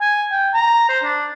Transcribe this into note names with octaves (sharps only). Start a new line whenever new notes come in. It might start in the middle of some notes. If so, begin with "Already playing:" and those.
G#5
G5
A#5
C5
D4